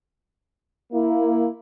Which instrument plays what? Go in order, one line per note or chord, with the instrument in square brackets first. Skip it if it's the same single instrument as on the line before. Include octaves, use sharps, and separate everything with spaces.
[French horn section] A#3 E4